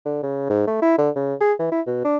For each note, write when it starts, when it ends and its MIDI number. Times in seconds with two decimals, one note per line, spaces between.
0.05 0.18 50
0.23 0.49 49
0.49 0.65 44
0.67 0.82 57
0.82 0.96 64
0.98 1.10 50
1.16 1.35 49
1.41 1.53 68
1.59 1.71 52
1.72 1.81 64
1.86 2.02 47
2.04 2.18 62